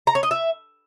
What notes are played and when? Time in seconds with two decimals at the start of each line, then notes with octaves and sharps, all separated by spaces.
0.07 A#5
0.15 C#5
0.23 D#5
0.31 E5